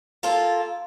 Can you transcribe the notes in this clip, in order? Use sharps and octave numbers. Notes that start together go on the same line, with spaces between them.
A#3 F4 A4